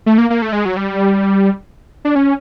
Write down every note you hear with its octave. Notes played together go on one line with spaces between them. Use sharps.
A3
A#3
A#3
A3
G#3
F#3
G3
D4
C#4